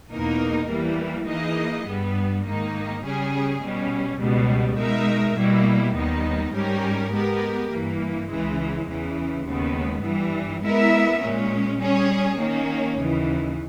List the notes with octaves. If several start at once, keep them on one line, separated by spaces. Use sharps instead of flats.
E2 B2 A#3 D#4 A#4
E3 G3 A#3
E3 A#3 D#4 G#4 D#5
G2 G3 B3
G#2 D#3 A#3 D#4
C#3 G3 C#4 G#4
B2 G3 C#4
C#2 B2 G3 B3
B2 G#3 D#4 A#4 E5
B2 G3 A#3 E4
D#2 D#3 G3 B3 D#4
G#2 G3 C#4 G4 A#4
G#3 B3 G4 A#4
G2 E3 A#3
C#2 C#3 E3 G#3
E2 C#3 E3
D#2 C#3 G#3 B3
G2 E3 G3
G#3 B3 E4 A#4 E5
A#2 G#3 C#4
G3 C#4 G#4 C#5
D#3 A#3 C#4
D#2 C#3 E3